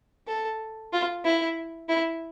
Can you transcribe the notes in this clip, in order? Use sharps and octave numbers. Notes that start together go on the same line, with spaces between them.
A4
F4
E4
E4